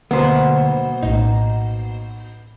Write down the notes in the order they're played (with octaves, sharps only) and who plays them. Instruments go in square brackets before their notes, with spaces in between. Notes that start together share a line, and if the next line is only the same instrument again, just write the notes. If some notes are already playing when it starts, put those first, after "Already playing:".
[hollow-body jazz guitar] D2 [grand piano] B2 F#3 A#3 [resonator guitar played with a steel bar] B3 C5
[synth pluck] A#1 A2 [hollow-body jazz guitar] D#4